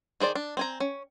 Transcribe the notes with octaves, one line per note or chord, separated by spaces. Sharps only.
D#3 G#4 C5 D5
D4
C4 G#5 A#5
C#4